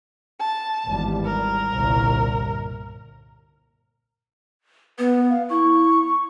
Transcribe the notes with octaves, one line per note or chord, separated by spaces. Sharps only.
A5
G#1 E2 G3
A#4
G1 C2 A#2
B3 B4
F5
E4 C#6